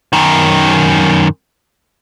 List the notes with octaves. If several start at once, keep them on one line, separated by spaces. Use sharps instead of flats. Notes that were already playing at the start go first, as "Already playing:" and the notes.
F#2 D#3